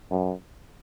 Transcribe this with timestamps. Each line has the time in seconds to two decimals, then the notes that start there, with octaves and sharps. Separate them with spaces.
0.11 F#2